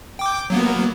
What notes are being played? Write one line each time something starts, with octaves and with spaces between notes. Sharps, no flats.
G5 D6
F#3 A#3 B3